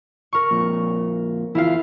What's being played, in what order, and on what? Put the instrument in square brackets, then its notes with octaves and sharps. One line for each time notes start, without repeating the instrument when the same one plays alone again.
[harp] A#4 C#6
[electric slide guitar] F2 A#2
[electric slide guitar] E2 F4 [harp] E4 F5